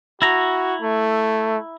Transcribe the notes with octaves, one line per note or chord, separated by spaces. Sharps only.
E4 F#4 A#5
A3